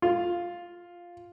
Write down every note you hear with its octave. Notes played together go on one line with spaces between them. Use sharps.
F4